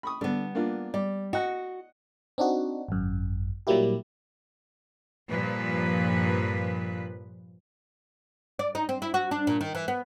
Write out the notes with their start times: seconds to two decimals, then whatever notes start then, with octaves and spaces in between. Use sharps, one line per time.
0.03 B5 C#6 D#6
0.21 D3 G3 B3 D4
0.55 A#3 D4 F4
0.94 G3 D5
1.33 F#4 D#5 F#5
2.38 C4 D4 D#4 F#4
2.89 G#1 F#2
3.67 A#2 F#3 G3 A#3 E4 G4
5.29 G2 A#2 F3 B4
8.59 D5
8.75 D#4
8.89 C4
9.02 E4
9.14 F#4
9.31 D4
9.47 A#2
9.61 D#3
9.75 E3
9.88 B3